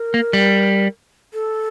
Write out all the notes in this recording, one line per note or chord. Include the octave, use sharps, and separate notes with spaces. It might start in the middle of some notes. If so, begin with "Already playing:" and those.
Already playing: A#4
A#3
G3
A4